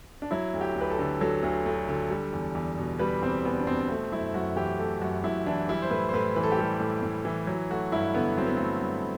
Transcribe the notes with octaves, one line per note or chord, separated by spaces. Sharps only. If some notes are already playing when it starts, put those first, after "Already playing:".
D4
F#3 E4
D2
G4
D2
B4
A4
D3
F#3 A4
D2
D2
D3
G3
E2
E2
B2
G3 B4
E2 C4
E2 B3
D4
B2 C4
A3 C4
F#2 E4
F#2 F#4
E3 G4
A3 A4
F#2 F#4
F#2 E4
E3 D4
G3 E4
C5
A2 B4
C5
A2 B4
E3 B4
A4
G4
G3 A4
A2
A2
E3
F#3
A3 F#4
G2 E4
D3 B3
F#3 C4
B3
A3 C4
G2